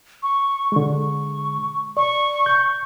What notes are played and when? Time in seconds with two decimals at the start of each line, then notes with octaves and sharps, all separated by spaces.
0.23 C#6
0.72 D3 G#3 C#6
1.97 D5 C#6
2.46 G6